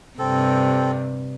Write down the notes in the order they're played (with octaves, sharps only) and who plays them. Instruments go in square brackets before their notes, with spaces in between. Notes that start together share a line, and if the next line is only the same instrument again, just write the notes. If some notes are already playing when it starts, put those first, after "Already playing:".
[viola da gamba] G2 C3 [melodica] C4 A4